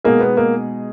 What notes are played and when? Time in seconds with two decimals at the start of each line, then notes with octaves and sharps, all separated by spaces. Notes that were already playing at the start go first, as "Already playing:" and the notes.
0.04 B2 G#3 A#3 D#4 G#4
0.20 B3
0.37 A#3